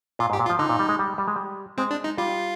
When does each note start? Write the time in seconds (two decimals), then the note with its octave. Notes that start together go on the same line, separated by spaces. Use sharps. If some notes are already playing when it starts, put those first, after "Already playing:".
0.19 A#2 F4
0.30 G#2
0.33 G4
0.39 A#2
0.46 F4
0.49 F3
0.59 D3 D#4
0.69 A#2
0.79 G3
0.89 G#3
0.99 G3
1.18 G3
1.28 G#3
1.36 G3
1.78 G#3 C4
1.91 D4
2.04 D#4
2.17 G3 F4